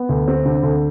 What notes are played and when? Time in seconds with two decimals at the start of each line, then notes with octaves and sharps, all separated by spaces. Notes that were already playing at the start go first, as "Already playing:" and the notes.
Already playing: B3
0.09 D2
0.28 C4
0.46 D3
0.63 D2